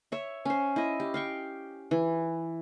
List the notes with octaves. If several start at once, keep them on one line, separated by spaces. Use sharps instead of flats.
C#5 E5
C#4 C5
E4 D#5
G4
F5 G5 C#6
E3